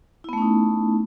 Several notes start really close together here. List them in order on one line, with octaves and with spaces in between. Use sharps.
E4 B3 A3 C#4 D#4